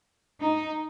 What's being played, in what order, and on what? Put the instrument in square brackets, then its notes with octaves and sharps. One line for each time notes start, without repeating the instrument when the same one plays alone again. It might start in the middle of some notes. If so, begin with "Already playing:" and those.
[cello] D#4